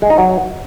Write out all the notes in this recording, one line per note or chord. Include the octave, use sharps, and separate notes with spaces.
G#3
D#4
F#3